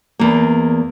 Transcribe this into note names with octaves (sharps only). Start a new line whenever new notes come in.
E2 A#3